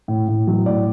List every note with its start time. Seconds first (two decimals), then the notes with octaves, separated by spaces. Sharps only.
0.08 A2
0.28 A2
0.47 F#3
0.66 A2 D5